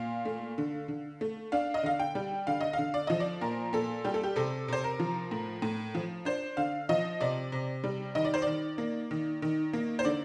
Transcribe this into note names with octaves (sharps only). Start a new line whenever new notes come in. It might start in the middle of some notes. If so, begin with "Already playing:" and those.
Already playing: A#2 F5
A3
D3
D3
A3
D4 F5
D#5
D3 F5
G5
G3
D3 F5
D#5
D3 F5
D5
F3 D#5
D5
A#2 A#4
A#2 A4
G3 G4
A4
G4
C3 A4
C3 C5
A#4
F3
A2
A2
F3
D4 C5
D3 F5
F3 D#5
C3 D5
C3
G3
D#3 D#5
D5
C5
D#3 D5
A#3
D#3
D#3
A#3
C5
D3 D5